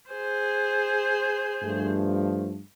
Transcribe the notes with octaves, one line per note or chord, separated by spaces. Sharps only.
G#4 C5
G2 F3 A3